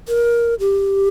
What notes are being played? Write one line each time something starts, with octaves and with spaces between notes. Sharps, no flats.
A#4
G4